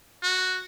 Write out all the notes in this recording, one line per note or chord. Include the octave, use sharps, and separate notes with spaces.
F#4